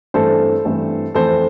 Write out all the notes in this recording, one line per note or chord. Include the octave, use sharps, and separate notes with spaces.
G2 E3 A3 C4 A4 C5
G2 E3 A3 C4
F2 E3 A3 C4 A4 C5